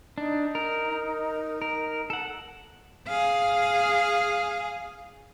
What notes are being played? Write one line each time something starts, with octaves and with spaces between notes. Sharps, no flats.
D4 D#4
A#4
A#4
A4 F#5
G#4 F5